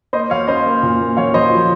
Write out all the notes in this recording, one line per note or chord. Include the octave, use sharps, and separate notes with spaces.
A#3 C5 D#5
F#3 C#5 F5
C#4 C5 D#5
A#3
A#2
A#3
F#3 C#5 F5
F#3 C5 D#5
F3